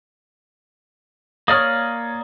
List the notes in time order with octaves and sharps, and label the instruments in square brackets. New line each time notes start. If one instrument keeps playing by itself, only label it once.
[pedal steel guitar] A#3 D5 F6 [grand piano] C#5 D#6